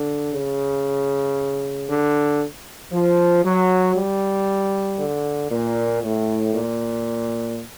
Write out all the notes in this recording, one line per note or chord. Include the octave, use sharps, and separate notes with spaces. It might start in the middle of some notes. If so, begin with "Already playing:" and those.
Already playing: D3
C#3
D3
F3
F#3
G3
D3
A#2
A2
A#2